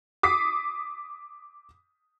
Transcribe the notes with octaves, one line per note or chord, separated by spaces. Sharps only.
D6 D#6 B6 C7